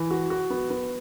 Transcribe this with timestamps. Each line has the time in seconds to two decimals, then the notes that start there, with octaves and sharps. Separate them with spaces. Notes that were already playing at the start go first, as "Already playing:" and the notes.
Already playing: E3
0.11 F#4
0.30 F#4
0.50 B3
0.70 B3